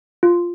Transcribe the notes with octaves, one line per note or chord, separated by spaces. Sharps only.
F4